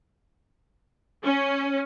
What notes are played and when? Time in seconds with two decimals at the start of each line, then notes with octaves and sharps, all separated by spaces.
1.25 C#4